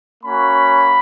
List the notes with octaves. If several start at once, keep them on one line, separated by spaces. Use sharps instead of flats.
A#3 C#4 F#4 B5